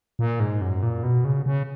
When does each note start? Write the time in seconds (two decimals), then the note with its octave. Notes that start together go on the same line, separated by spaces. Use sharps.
0.19 A#2
0.40 G#2
0.61 F#2
0.83 A#2
1.03 B2
1.25 C#3
1.46 C#3